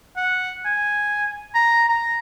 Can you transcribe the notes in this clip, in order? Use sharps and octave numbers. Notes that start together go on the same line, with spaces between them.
F#5
G#5
A#5
A#5